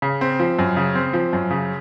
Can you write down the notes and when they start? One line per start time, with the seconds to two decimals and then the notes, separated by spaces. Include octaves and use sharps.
0.02 C#3
0.21 C4
0.40 F3
0.59 F#2
0.77 C#3
0.95 C4
1.13 F3
1.33 F#2
1.51 C#3